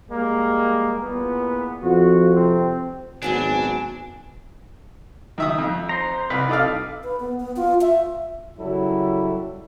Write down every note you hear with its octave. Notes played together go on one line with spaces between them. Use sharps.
G3 G#3 A#3
E2 A#2 B3
F2 F4 F#4
C3 C4
G#1 F#3 B3 C#4 D4 G#5
D#3 E5 D#6
F2
C5 A#5
C2 B4
D#4 A4 D5 F5
B4
B3
B3
F4
E5
C#3 F#3 G3 E4 A4